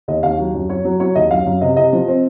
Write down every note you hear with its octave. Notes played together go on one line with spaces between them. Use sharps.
D#2 D#5
D#2 F5
F#3
F#2
F#3 C#5
F#3
F#3 C#5
D#2 D#5
F#2 F5
F#2
C3 D#5
C3 D#5
F3
C4